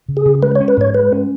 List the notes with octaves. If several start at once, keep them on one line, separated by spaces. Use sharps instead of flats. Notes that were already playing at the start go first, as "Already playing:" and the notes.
C#3
G#4
C#3
G#3 B4
C#5
C#4
B4
G#2 C#5
G#3 B4
C#4